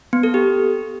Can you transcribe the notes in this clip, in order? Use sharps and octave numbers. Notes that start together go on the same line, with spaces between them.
B3
A4
G4